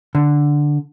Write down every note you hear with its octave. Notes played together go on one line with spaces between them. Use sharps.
D3